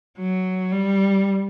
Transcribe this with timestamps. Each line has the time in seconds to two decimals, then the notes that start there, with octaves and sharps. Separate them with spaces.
0.19 F#3
0.72 G3